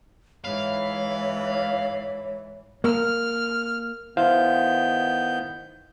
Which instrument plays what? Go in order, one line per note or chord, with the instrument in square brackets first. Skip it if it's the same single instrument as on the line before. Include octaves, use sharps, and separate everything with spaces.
[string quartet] G#2 E3 E4 [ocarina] C#5 [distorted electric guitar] F5 [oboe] B5
[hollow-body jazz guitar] A#3 [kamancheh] F6
[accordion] D#3 B3 G6 [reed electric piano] E4 C5 F5